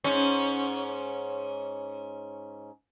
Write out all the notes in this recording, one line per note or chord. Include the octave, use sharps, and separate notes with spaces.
G#2 C#4